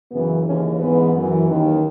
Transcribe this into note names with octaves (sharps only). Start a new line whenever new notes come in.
F#2 C#3 E3 B3
D#2 C#3 E3 C#4
G#2 E3 B3
F#2 E3
D#2 D#3